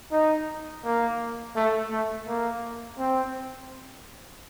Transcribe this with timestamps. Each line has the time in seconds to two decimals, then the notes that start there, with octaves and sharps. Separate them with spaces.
0.12 D#4
0.84 A#3
1.56 A3
1.91 A3
2.27 A#3
2.99 C4